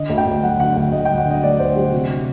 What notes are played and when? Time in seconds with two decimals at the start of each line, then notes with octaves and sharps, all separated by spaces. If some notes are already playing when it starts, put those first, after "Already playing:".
Already playing: D3 D#5
0.09 D2
0.18 G5
0.26 D2
0.43 F#3 F#5
0.59 D3 F#5
0.76 D2 F#5
0.92 D2 D#5
1.05 F#3 G5
1.18 F#5
1.25 D3
1.30 D#5
1.43 D2 D5
1.60 D2 C5
1.75 F#3 G4
1.92 C3 F#4
2.09 F#3